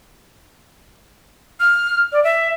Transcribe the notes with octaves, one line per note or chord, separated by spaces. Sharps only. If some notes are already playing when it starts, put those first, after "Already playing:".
F6
D5
E5